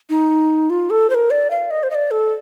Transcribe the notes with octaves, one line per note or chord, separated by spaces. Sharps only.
D#4
F4
A4
C5
A#4
D5
F5
D#5
C5
D#5
D5
A4